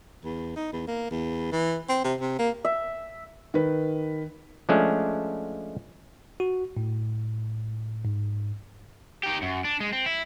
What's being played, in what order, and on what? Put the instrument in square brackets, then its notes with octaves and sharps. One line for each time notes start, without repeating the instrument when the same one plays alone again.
[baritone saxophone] E2
D#4
E2
A#3
E2
E3
C4
C3
C3
A#3
[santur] E5
[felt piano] D#3 A#4 B4
[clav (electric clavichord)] F3 G#3 A3 C#4 D4
[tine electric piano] F#4
A2
G#2
[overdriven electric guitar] D#4 G4
F#2
D4
G#3
C4
E4